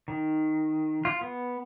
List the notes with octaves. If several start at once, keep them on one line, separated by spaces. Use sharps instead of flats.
D#3
F4
B3